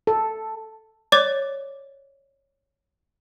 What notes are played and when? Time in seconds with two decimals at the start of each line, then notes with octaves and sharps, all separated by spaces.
0.07 A4
1.12 C#5 D5 D6 A6